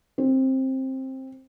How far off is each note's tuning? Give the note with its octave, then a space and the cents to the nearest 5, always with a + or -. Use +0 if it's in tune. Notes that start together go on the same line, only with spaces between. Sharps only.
C4 +15